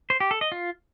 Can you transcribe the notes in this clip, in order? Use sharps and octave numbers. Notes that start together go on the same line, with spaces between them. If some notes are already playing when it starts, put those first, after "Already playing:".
C5
G4
A4
D#5
F4